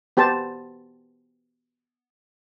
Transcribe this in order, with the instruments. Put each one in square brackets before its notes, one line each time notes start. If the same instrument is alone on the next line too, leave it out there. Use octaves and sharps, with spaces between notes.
[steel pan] B3 G4 C5 A5